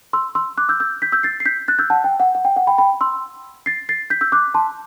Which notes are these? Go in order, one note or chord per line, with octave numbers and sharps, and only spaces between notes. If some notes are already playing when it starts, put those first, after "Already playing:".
C6 E6
C6 E6
D6 F#6
E6 G6
E6 G6
G6 B6
E6 G6
A6 C7
C7
G6 B6
F#6 A6
E6 G6
F#5 A5
G5
F#5
F#5
G5
F#5
G5 B5
G5 B5
C6 E6
A6 C7
A6 C7
G6 B6
E6 G6
D6 F#6
A5 C6